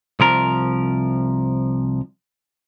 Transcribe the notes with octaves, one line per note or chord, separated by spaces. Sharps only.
C2 F3 A#4